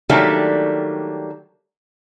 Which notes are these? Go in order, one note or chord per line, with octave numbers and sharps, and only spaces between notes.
D#3 F#3 G3 A3 A#3 D4